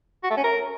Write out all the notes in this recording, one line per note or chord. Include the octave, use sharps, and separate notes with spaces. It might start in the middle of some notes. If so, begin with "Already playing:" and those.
F#4
A3
C#4
A#4